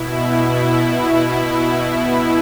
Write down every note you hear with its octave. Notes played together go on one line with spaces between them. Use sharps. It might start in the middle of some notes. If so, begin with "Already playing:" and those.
Already playing: B2 E4
E4
B2